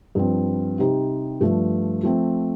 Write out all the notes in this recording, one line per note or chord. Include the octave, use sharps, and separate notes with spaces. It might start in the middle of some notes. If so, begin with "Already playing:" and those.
G2 F3 C4
C3 G3 C4 D#4 G4
G2 F3 A3
F3 A3 C4